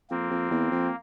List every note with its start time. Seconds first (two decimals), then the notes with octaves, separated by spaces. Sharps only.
0.10 F2 A#3 C4
0.31 F2
0.51 E2
0.71 F2